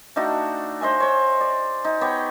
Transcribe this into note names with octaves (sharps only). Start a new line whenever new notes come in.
A3 D4 D#4 F#4
C5 D#5 E5 G#5
C5 C#5
D5
D#4
B3 G4 C#5